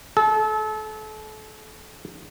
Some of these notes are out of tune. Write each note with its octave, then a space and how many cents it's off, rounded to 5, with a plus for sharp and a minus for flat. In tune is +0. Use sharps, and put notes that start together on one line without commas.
A4 -35